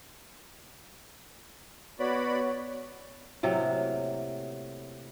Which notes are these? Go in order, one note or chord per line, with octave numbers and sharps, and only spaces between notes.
B3 F#4 C#5 D5 B5
A2 C3 F#3 A#3